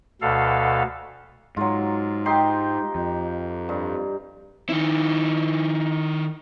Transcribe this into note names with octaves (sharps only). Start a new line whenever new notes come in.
D2 B2 A4 F5
G#2 F#3 F4
D#4 G4 C6
F2
G2
D#3 E4